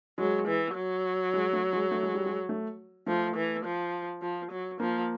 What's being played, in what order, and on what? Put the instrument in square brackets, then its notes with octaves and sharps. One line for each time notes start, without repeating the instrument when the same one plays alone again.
[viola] F#3 [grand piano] G#3
[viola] E3
F#3
[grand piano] G#3
A3
G#3
A3
G#3
G3
G#3
A3
[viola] F3 [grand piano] A3
[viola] E3
F3
F3
F#3
[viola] F3 [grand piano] A#3